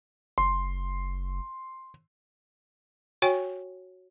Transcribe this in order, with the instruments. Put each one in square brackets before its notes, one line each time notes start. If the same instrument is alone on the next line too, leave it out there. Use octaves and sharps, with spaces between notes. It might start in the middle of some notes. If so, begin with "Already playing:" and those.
[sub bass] F#1 [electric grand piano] C6
[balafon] F#4 C#5 G5 G#5